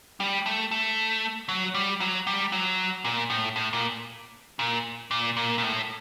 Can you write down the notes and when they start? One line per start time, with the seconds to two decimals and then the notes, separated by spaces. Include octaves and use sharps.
0.20 G3
0.46 A3
0.71 A3
1.49 F#3
1.74 G3
2.00 F#3
2.27 G3
2.52 F#3
3.05 A#2
3.30 A2
3.56 A2
3.73 A#2
4.59 A#2
5.11 A#2
5.37 A#2
5.58 A#2
5.62 A2